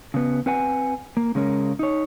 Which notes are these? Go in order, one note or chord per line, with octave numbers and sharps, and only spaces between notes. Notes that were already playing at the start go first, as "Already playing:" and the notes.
C#3 B3
C4 B4 F#5 G#5
A#3
C#3 G#3 C#4 A#4
D#4 C#5